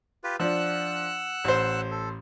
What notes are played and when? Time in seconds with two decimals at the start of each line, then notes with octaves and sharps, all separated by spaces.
0.24 F4 G4 B4
0.40 F3 D4 F#5 E6 F#6
1.44 A1 C5
1.91 A4